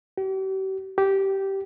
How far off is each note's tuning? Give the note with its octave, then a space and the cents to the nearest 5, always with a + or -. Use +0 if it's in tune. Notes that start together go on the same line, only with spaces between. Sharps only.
G4 -45
G4 -15